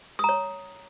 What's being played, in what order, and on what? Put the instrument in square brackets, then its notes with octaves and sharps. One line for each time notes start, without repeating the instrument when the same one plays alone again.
[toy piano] D#6
A#5
C#5